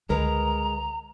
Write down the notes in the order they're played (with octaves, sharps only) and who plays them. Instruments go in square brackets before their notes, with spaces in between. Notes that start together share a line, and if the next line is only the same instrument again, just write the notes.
[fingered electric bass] C#2 D3 [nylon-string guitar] G#3 A#4 B4 [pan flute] A#5